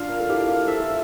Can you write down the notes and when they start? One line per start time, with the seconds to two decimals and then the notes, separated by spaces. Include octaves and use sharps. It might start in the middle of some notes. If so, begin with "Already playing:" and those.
Already playing: D4 F4 F5
0.09 A#4
0.20 A4
0.29 E4 G4
0.48 G4 A#4
0.67 A4 C5 E5
0.80 F4 A4